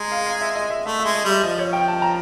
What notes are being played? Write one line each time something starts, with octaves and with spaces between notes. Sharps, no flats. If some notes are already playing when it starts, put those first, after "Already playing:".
Already playing: G#3 A#5
F5
F5
E5
D#5
E5
A3 E5
E5
G#3
D#5
G3 E5
F3 D#5
C#5
G5
A5
A#5